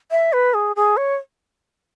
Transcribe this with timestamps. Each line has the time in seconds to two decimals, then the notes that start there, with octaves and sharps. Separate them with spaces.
0.11 E5
0.33 B4
0.54 G#4
0.76 G#4
0.97 C#5